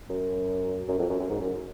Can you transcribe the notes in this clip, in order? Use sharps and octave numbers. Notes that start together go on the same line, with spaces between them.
F#2
F#2
F2
F#2
F#2
G#2
F#2